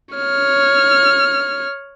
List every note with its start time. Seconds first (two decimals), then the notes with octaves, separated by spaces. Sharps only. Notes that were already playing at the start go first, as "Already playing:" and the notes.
0.15 C#5 F6